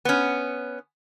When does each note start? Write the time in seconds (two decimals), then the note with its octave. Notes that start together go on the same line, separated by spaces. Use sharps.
0.05 B3 C#4